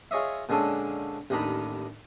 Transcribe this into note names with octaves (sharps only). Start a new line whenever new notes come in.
F4 G#4 C#5 D#5 E5
A#2 D3 G#3 C#4 D4 A4
A1 D#2 D#3 D4 D#4 B5